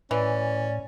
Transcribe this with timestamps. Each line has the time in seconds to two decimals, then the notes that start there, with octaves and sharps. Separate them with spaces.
0.11 A2 E3 C#4 D5